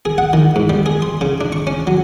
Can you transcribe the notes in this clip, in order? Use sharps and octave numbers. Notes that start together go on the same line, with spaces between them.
G#4
F#5
D#3
G#2
G3
G#4
C6
C#3
D4
C#6
C#4
F#3